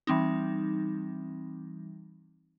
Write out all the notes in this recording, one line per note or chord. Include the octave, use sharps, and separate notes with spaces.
E3 G3 C4 D#4